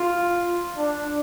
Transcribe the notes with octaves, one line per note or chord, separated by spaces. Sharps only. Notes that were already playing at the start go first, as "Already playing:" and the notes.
Already playing: F4
D4